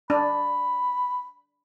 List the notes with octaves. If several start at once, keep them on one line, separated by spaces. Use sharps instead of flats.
D4 B5